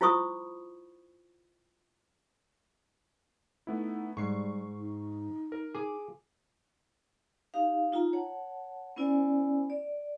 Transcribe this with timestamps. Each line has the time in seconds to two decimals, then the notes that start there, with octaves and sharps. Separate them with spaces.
0.01 E4 F4 C5 B5 C#6 D#6
3.67 A3 B3 D#4 E4
4.17 G#2 G3 C#6 C7
4.77 D#4
5.52 A#4
5.75 G#4 D6
7.54 D#4 G4 F5
7.92 D#4 F4 G5 A#5
8.13 C#5 F#5 A5
8.96 B3 C#4 E4 C5 D5 G#5
9.70 D5